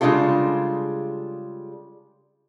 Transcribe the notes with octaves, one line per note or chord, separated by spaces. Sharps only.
C#3 G3 G#3 D4 F4 A4